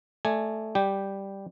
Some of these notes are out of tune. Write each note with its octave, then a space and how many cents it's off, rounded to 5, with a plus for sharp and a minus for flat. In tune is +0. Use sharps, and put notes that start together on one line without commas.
A3 -5 D5 +20 G#5 +0
G3 +0 G4 +0 G5 +0